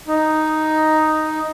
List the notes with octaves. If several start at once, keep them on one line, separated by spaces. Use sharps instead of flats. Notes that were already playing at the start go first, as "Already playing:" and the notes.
D#4